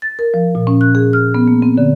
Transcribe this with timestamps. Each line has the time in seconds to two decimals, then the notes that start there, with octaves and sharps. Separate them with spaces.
0.02 A6
0.19 A#4
0.34 F3
0.55 A#2
0.67 C#4
0.81 F#6
0.95 G#4
1.13 F6
1.35 B3
1.48 A#3
1.62 C4
1.78 D3